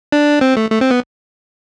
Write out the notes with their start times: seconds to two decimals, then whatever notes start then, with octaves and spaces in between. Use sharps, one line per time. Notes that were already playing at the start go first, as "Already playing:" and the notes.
0.12 D4
0.41 C4
0.57 A3
0.70 A3
0.81 C4
0.91 B3